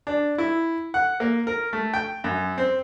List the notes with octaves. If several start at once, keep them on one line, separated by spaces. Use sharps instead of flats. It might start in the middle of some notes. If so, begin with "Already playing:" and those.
D4
E4
F#5
A#3
A#4
A3
G5
F#2
C4